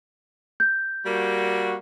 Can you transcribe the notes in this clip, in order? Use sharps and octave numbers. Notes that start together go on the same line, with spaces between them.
G6
G3 A#3 F#4